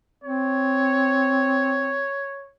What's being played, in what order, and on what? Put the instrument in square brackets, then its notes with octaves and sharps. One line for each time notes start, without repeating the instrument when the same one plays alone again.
[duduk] C4 [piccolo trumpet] C#5